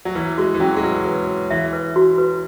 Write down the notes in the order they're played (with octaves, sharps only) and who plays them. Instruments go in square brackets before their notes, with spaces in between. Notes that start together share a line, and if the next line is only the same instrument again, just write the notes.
[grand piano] F#3
[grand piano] E3 [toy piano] B4
[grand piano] G#3 [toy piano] F#4
[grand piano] E3
[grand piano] F#3 [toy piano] C#4
[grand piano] G#3
[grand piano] F#3 [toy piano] B4
[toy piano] B4
B4
[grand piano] E3 [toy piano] E5
[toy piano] B4
F#4
B4